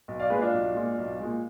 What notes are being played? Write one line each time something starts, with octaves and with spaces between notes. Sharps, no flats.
B1
D5 F5
A#2 G#3 G#4 B4
D4 F4
B1
A#2 G#3
B1
A#2 G#3